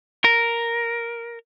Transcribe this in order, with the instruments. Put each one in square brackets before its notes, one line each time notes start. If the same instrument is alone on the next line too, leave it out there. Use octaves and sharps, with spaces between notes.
[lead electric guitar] A#4